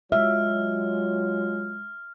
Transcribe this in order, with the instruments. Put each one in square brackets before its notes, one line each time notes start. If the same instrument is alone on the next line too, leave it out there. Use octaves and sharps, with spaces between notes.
[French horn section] F#3 F4 C#5 [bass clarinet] G#3 [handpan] E5 [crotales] F6